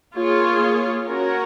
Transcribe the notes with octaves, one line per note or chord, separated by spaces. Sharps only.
A#3 F4 G#4 C#5
C#4 F#4 A#4 C#5